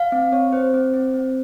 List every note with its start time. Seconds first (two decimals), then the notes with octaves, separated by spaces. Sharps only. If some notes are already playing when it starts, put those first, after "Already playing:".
Already playing: F5
0.12 C4
0.32 C4 C#5
0.53 C4 C5
0.74 C4
0.94 C4
1.14 C4